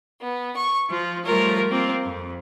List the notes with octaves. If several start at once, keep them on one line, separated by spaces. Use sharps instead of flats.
B3
C#6
F3 F4
F3 G3 A3 F4 A#4 C#5
A#3 C4 F4
F2